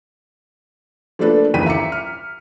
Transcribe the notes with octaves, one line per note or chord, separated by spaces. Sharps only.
F3 A3 A#3 D4 A4 B4
F#1 D#2 E3 G5 B6 D#7
E5 A#5 D6 C#7
F6